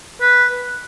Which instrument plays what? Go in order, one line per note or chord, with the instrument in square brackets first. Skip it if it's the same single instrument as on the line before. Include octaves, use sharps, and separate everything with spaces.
[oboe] B4